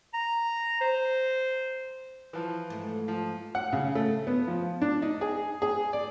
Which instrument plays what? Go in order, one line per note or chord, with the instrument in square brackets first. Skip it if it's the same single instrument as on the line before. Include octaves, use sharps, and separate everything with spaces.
[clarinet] A#5
C5
[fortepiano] E3 F3
[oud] G#2 A3
[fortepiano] F3
F#5
C#3
A3
B3
F3
D4
D#4
G#4
G#4
D5